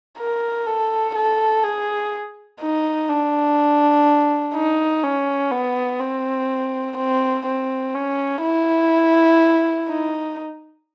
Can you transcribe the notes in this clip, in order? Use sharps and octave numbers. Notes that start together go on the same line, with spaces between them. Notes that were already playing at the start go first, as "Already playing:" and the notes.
A#4
A4
A4
G#4
D#4
D4
D#4
C#4
B3
C4
C4
C4
C#4
E4
D#4